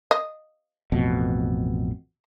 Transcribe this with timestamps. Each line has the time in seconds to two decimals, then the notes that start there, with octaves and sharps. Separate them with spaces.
0.11 D#5
0.92 A1 F2 B2